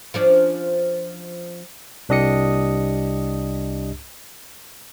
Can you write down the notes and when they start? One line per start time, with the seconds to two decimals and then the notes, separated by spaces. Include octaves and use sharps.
0.14 F3 C#4 D4
2.09 C2 D4 G4 D#5 D#6 C#7